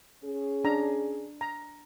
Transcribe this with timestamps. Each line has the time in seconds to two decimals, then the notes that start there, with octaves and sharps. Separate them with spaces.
0.24 C#4 G#4
0.64 D4 A#5
1.41 A#5